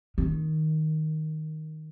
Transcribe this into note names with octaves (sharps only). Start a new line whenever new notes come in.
D#3